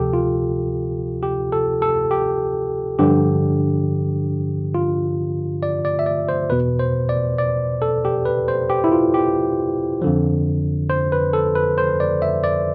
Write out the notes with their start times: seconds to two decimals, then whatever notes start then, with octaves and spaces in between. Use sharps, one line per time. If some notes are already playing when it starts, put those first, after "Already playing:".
Already playing: D2 C3 F3 G4 A4
0.13 F4
1.23 G4
1.52 A4
1.82 A4
2.11 G4
2.99 G2 D3 F3 G4
4.75 F4
5.63 D5
5.85 D5
5.99 E5
6.06 D5
6.29 C5
6.50 E2 B2 B4
6.79 C5
7.09 D5
7.38 D5
7.82 A4
8.05 G4
8.25 B4
8.48 C5
8.70 G4
8.84 E4
8.92 F4
9.14 G4
10.02 F2 D3 F3
10.90 C5
11.12 B4
11.33 A4
11.55 B4
11.78 C5
12.00 D5
12.22 E5
12.44 D5